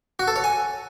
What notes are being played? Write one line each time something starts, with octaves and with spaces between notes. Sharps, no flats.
F#4
A4
C#5
G#5